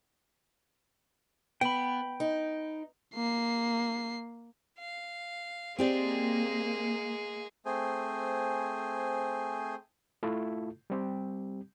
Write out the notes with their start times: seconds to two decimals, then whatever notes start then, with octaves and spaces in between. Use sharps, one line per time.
1.61 B3 G5 B5
2.20 D#4
3.15 A#3 C7
4.78 F5
5.78 G#3 A#3 C4 G4 G#4 D5
7.66 A3 C4 G#4 C5 G#5
10.23 A3 E4 F4 A4
10.90 G3 C4 G4